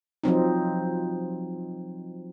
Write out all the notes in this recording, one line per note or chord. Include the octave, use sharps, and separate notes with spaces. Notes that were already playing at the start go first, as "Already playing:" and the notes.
F3 F#3 C4 D#4